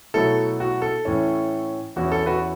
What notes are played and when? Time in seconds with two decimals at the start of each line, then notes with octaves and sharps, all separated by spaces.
0.14 B2 F#3 A3 E4 A4
0.60 F#4
0.82 A4
1.05 A2 E3 C#4
1.96 E2 E3 C#4 E4 F#4
2.12 A4
2.26 F#4 B4